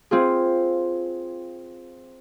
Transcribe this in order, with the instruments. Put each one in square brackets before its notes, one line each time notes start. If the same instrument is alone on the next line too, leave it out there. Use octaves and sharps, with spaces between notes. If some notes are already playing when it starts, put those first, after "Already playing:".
[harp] C4 F4 G#4